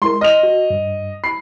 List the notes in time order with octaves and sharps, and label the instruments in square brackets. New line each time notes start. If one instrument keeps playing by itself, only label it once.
[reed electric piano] G#3 E4 A#4 [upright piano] C6
[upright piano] D#5 F7 [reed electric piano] C6 F6
[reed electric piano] F#4
G2
[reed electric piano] B5 [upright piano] C7